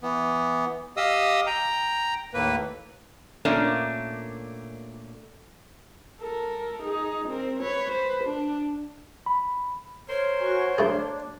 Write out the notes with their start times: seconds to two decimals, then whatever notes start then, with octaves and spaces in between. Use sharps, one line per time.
0.03 E3 B3
0.97 G4 D#5 F5 D#6 E6
1.47 G5 A#5
2.34 D#2 A2 A#3 B4
3.45 A#2 A3 A#3 C#4 D4
6.21 A4 A#4
6.83 D#4 G#4
7.29 C4 A#4
7.60 B4 C#5
7.89 B4 C5
8.24 D4
9.26 B5
10.09 A#4 C5 C#5
10.40 F#4 G#5 C#6
10.78 A3 D4 G#4